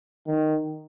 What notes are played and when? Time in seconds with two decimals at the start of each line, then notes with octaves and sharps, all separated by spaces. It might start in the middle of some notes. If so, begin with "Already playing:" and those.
0.27 D#3